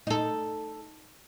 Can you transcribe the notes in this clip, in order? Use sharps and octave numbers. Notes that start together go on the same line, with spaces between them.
D#4 A4